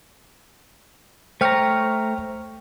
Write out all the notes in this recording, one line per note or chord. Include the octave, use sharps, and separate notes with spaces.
A3 C5 C#5 G5 A#5 F6